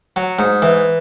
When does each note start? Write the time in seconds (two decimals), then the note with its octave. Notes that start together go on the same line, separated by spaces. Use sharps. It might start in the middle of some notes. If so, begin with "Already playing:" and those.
0.16 F#3
0.39 G#2
0.62 E3